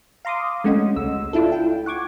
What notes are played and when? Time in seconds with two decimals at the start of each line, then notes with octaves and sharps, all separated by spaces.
0.25 F5 A#5 C6 D6 D#6
0.64 G#3 A3 C#4 F#4 D#5
0.96 C#2 E6
1.33 D4 E4 F4 A4
1.52 G5
1.86 F#5 C#6 D6 G#6